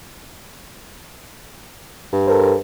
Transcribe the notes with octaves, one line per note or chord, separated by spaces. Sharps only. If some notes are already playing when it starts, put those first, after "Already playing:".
G2
A4 A#4 C5